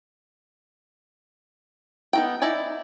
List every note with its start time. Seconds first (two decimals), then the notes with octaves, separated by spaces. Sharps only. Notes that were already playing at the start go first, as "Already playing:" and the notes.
2.13 B3 D#4 F#4 A4 G5
2.42 D#4 E4 D5 G#5 B5